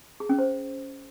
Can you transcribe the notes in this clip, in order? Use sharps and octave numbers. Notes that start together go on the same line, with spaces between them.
G#4
C#4
C5